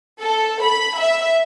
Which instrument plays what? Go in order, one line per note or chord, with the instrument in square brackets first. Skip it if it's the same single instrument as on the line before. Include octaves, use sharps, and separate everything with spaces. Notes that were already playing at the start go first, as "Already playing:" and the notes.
[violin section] A4
B5
E5